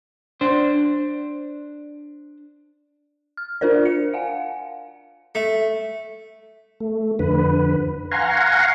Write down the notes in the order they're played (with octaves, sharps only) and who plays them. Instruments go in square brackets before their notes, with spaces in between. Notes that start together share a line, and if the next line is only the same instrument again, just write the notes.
[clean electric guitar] D4 C5
[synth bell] F6
D4 F4 A#4 C5 D5
C#7
F5 F#5 G#5
[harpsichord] A3
[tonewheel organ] A3
F2 D3 B4
F5 F#5 G#5 A#5 C6 C#6